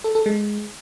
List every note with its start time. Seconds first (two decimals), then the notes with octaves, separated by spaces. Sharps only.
0.04 A4
0.15 A4
0.26 G#3